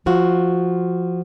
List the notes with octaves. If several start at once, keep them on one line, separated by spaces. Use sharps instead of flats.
F3 F4 F#4